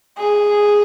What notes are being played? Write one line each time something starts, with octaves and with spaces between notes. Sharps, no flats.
G#4